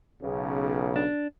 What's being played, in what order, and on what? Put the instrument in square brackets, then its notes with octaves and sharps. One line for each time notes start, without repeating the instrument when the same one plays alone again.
[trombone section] B1 C#3
[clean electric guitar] D4